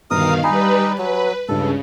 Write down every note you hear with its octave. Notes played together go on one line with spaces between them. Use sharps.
G1 B2 D#3 A#4 F5 D#6
G3 D#4 B4 G#5 B5
F#3 B4
C#2 G2 C#3 A4